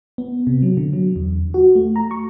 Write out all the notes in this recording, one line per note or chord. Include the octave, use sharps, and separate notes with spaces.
B3
C3
F#3
D3
F#3
E2
F#4
A3
A#5
C#6